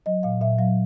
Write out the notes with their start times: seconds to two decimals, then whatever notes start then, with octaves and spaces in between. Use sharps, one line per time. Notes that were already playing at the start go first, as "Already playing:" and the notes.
0.06 F#3 D#5
0.23 A#2 F5
0.41 A#2 E5
0.59 F#3 F5